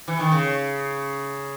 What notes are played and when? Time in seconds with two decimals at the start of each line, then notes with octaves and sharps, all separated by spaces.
0.08 E3
0.20 D#3
0.32 C#3